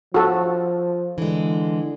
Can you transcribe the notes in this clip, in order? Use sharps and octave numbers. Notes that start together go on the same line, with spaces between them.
F3 F#4 A4
D3 E3 G#3